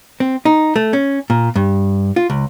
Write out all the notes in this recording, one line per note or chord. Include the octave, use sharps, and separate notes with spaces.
C4
D#4
A3
C#4
A#2
G2
F4
C#2